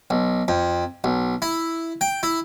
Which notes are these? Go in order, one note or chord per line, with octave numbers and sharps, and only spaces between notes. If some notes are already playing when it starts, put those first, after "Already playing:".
B1
F2
B1
E4
G5
E4